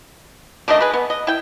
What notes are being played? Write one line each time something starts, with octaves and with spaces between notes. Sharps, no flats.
D3 D#3 A3 D#5
G#4 B4
B3
D#5
E4 G5